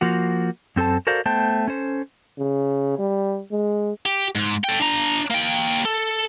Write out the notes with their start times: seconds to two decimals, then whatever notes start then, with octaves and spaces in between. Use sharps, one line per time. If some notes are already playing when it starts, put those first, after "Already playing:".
0.01 F3 A#3 F#4
0.76 F#2 C4 A4 C5 A5
1.07 F#4 A4 A#4 C5 D5 F5
1.26 A3 B3 C5 G5 A5
1.68 C#4 A4 C5
2.38 C#3
2.98 G3
3.51 G#3
4.05 G4
4.35 G#2
4.64 A4 G5
4.80 D4 A#5
5.31 A#3 G5
5.85 A4